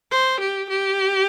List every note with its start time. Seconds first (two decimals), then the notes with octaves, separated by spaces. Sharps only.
0.11 C5
0.40 G4
0.69 G4